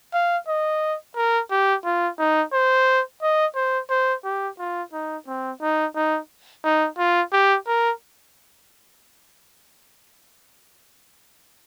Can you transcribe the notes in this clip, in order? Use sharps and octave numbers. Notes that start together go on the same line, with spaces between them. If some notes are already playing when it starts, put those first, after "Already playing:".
F5
D#5
A#4
G4
F4
D#4
C5
D#5
C5
C5
G4
F4
D#4
C4
D#4
D#4
D#4
F4
G4
A#4